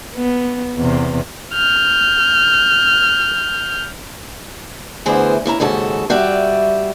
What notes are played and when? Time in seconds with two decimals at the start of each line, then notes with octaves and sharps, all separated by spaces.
0.16 B3
0.77 E2 C3
1.54 F6 G6
5.06 D2 E3 B3 E4 G#4 C5
5.46 C#3 E4 A5 A#5
5.60 D#2 G#2 C#3 F#4 A4
6.10 G3 F#4 D5 E5